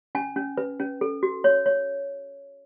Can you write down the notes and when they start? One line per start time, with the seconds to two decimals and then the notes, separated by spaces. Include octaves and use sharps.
0.15 C#4 G#5
0.36 C#4
0.58 B4
0.80 C#4
1.01 A4
1.23 F#4
1.44 C#5
1.66 C#5